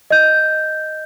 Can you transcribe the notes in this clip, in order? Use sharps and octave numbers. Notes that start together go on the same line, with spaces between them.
D#5 G6